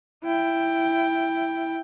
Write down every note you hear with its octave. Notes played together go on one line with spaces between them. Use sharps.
E4 G5